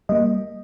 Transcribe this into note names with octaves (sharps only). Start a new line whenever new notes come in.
G3 A#3 D#5